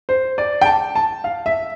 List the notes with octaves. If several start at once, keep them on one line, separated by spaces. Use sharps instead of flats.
C5
D5
G5
A5
A5
F5
E5